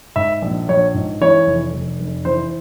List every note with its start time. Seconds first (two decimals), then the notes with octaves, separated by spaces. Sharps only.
0.16 G#2 E5
0.42 A#1
0.68 A#1 C#5
0.94 G#2
1.21 E3 C#5
1.47 F1
1.74 F1
2.00 F1
2.25 E3 C5